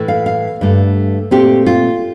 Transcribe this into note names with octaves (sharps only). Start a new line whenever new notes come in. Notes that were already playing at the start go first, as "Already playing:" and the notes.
Already playing: A2 E3 A3
F5
F5
G2 D3 A3
A#2 A3 C4 G4
F4